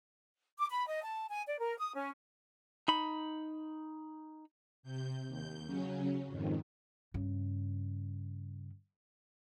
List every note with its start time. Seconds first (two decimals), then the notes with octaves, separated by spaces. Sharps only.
0.57 D6
0.69 B5
0.87 D#5
1.02 A5
1.29 G#5
1.47 D5
1.59 A#4
1.78 D#6
1.95 C#4
2.88 D#4 B5
4.83 C3 G6
5.28 D#2 G6
5.66 C#3 F#3 C#4
6.27 F2 G#2 D#3
7.14 G2 C#3